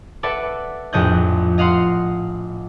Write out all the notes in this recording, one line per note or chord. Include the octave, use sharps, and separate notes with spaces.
A4 B4 D5 E5 F#5
A#1 F2 A2 D#5 F#6 G6
D#5 F5 F#5 C6